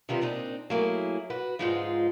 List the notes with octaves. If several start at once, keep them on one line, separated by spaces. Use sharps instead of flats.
C3 D#3 G3 F4 G4 B4
A#2 C4 D4 D#4
F#3 A3 A#3 E4 G#4
F#4 B4
G#2 D3 F3 G#3 D#4 F4